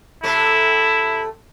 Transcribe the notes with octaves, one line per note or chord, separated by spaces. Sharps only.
C3 A3 E4